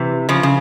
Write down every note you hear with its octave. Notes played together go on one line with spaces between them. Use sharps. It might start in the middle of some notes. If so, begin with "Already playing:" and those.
Already playing: C3 E3
C#3 F3
C#3